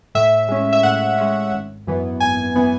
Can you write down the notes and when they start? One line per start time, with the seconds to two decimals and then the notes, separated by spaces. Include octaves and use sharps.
0.15 A2 E5
0.48 G#3 C#4
0.73 E5
0.83 A2 F#5
1.18 G#3 C#4
1.52 G#1
1.87 F#2 E3 B3
2.20 G#1 G#5
2.56 E3 B3